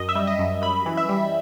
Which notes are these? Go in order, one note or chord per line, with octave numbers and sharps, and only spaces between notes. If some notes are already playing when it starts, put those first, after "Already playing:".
Already playing: F#2 D#5
E5
G3
D#5
F#2
F#2 B5
E3
E5
G3